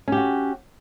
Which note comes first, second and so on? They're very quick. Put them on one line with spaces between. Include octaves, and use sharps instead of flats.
C#4 G4 F#4